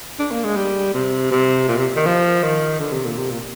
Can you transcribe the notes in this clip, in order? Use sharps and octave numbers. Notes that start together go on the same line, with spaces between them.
D4
A#3
G#3
G3
C3
C3
A#2
C3
D#3
F3
D#3
D3
C3
A#2
C3
A#2